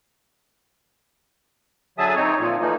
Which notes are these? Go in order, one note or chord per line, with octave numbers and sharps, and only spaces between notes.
D3 F#3 G#4 E5 A5 D#6
C4 D#4 C#5
A#2 F3
E3 F3 A3 A#3 D#4